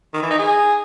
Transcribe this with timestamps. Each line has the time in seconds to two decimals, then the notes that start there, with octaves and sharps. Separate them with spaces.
0.14 D#3
0.22 E3
0.30 D#4
0.39 G#4